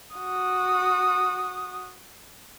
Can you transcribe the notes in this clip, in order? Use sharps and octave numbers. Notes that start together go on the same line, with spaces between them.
F#4 D#6